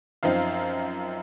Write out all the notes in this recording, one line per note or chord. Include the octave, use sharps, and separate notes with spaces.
F#2 F3 C4 D#4 F5